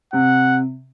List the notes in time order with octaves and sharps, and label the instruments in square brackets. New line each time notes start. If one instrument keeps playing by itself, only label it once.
[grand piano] C3 [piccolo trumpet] F#5